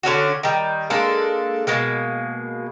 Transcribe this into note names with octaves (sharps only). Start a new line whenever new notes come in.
D3 C#4 D4 F#4
D#3 G3
G#3 A#3 D4 A4
B2 G#3 A#3